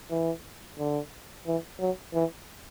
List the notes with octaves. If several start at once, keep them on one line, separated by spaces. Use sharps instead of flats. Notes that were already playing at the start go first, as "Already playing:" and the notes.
E3
D3
E3
F#3
E3